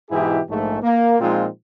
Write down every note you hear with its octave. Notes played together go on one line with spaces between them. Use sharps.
G#2 B2 E3 E4 G4 G#4
A#1 G#2 A3
A#3
A#2 F3 G#3 C4 D#4 F4